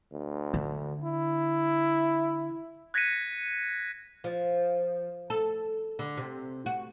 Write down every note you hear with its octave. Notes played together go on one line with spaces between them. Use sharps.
D2
D3
E4
F#6 G#6 A#6 B6 C#7 D#7
F3
A4
D3
C3
F#4